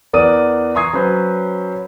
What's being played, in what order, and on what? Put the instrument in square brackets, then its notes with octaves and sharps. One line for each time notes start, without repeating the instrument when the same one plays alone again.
[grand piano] E2 A#4 D5 F#5 D#6 D#7
A#5 C6 C#6 D#6 G#6 C7
F#3 C#4 B4 C5